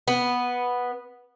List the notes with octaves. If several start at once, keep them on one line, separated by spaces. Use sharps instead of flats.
B3